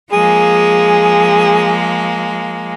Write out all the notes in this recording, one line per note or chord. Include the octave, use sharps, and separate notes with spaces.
F3 G#3 A#3 G#4